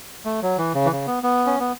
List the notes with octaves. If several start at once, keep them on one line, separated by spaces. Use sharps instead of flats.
A3
F#3
E3
C#3
E3
C#3
B3
B3
C#4
B3